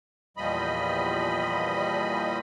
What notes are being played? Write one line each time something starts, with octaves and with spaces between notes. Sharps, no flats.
E2 A#2 F3 G3 D#5 B5